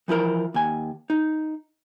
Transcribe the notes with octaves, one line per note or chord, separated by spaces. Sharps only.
E3 F3 E4 A#4
D#2 G#5
D#4